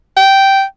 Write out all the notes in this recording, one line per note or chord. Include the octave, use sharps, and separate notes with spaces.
G5